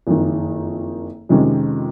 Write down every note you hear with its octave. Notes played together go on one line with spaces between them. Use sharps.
F#1 F2 D#3
F2 C3 D#3 G#3 C#4